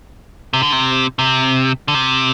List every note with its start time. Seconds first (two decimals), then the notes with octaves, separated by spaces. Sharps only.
0.54 C3
0.63 D3
0.72 C3
1.19 C3
1.88 D3
1.94 C3